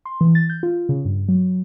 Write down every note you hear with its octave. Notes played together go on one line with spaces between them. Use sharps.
C6
E3
A6
G6
F4
C#3
G2
F#3